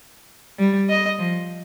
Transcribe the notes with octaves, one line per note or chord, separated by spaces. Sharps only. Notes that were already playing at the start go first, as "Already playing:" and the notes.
G3
D#5
F3